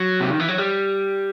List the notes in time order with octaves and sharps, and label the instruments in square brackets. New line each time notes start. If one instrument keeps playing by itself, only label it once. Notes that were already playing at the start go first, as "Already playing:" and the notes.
Already playing: [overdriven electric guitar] F#3
C3
D#3
E3
F#3
G3